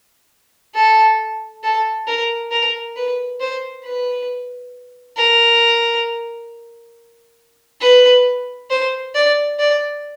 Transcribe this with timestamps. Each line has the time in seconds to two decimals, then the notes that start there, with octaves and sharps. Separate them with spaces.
0.75 A4
1.63 A4
2.07 A#4
2.51 A#4
2.96 B4
3.40 C5
3.85 B4
5.16 A#4
7.81 B4
8.70 C5
9.15 D5
9.59 D5